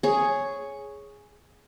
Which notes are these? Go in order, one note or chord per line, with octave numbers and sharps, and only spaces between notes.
G#4 C#5